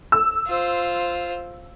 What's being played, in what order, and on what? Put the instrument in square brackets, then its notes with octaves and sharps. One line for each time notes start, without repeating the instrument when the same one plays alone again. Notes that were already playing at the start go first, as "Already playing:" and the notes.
[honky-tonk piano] E6
[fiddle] F4 C5